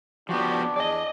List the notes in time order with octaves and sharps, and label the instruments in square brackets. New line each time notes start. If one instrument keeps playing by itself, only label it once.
[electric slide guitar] F3 B3 [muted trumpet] D4 [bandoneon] F#4 G4
[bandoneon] E2 G#4 [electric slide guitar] D5 D#5